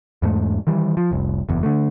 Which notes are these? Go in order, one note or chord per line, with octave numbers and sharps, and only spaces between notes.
E2 G#2 A3
D#3 E3 G3
F3
F1 C2
F#1 E2
D3 A3